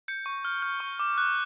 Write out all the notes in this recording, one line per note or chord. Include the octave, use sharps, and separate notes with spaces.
G6 C#7
C#6
F6
F6
C#6
D6
F#6